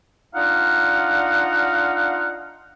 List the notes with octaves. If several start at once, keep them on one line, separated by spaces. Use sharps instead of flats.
D4 D#4 F4 F5 F#5